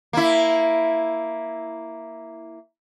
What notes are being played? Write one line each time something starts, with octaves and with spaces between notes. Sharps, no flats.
A#3 E4